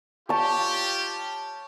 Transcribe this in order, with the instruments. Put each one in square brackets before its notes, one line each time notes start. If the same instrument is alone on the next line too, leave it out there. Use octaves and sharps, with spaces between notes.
[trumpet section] F4 G4 [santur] C#5 A5